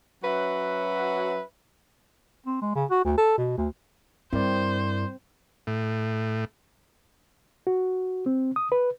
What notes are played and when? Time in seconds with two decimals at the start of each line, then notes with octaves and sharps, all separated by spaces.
0.23 F#3 C#4 F#4 B4 E5
2.46 C4
2.62 G#3
2.75 C#3
2.90 F#4
3.05 D2
3.18 A4
3.38 B2
3.57 D2
4.33 G2 C4 E4 A#4 C5 D5
5.67 A2
7.67 F#4
8.26 C4
8.56 D#6
8.72 B4